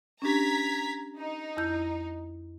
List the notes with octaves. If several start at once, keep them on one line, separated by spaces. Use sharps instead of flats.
C#4 D4 G4 A#5 G#6 B6
D#4
F2 E4 G6